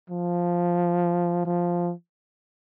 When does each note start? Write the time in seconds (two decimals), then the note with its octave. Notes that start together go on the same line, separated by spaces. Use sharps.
0.10 F3
1.45 F3